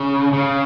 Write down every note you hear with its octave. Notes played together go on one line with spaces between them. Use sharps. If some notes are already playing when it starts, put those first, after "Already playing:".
Already playing: C#3
C#3